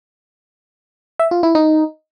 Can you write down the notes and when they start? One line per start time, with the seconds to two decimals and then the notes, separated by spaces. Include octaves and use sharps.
1.19 E5
1.31 F4
1.43 E4
1.55 D#4